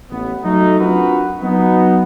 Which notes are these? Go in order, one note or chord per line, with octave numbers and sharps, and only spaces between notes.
A1 B3
F#3 A3 D#4
C4 D4 F4 F#4 A#4 B4
F#3 B3 D#4